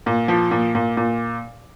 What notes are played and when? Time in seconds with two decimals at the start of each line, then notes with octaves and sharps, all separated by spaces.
0.06 A#2
0.28 F3
0.51 A#2
0.75 A#2
0.97 A#2